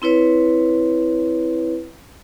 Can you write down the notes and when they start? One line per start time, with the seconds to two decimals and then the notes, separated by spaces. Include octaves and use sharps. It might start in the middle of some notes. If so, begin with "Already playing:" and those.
0.02 C4 E4 B4 C#5